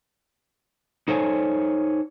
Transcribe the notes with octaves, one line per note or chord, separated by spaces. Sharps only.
D#4 A4 C5 C#5 F#5 G#5